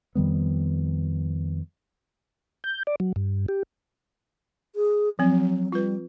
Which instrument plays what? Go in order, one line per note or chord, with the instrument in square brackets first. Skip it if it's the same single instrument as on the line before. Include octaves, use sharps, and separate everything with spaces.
[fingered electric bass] F2 D#3 G3 B3
[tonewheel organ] G6
D5
F#3
G2
G4
[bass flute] G#4
[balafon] F3 C4 [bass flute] F#3
[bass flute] G3 [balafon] F4 B4